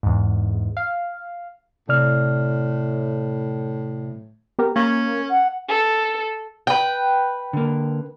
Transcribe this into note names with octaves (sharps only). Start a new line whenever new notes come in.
E2 G#2
F5
A2 C3 D5 F6
B3 G4 A#4
A#3 C#4
F#5
A4
B4 G5
D3 A#3